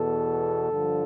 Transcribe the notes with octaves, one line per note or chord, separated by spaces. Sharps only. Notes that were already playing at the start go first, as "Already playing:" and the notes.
Already playing: E2 B2 A4
G2 D3 F3